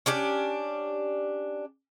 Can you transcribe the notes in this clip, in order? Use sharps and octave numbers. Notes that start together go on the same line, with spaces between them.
C#4 D4 G4 D5